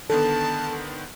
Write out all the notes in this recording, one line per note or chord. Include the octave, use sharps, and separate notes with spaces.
D3 D#3 B3 A4 A5